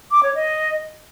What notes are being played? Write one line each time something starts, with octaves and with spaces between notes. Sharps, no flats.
D6
C#5
D#5